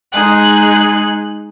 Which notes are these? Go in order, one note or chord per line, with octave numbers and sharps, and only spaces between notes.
G#3 D#4 G#4 F#6